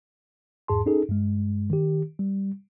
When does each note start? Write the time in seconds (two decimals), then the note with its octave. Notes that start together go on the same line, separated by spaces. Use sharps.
0.68 E2 G#2 G#4 A5 C6
0.86 C#4 D#4 G#4 A4
1.09 G2 G#3
1.70 D#3 G4
2.19 G3